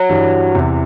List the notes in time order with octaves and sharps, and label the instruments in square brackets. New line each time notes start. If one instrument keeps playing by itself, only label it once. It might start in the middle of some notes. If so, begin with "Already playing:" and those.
Already playing: [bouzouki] F#3
[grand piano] G2 E3 G3
E2 C3 E3